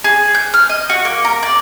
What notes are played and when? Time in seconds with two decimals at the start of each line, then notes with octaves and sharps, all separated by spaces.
0.04 G#4
0.35 G6
0.54 F6
0.69 D#5
0.90 F#4
1.05 A#3
1.25 A#4
1.43 D5